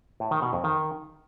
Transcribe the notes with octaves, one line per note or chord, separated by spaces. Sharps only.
A2
D#3
B2
F2
D#3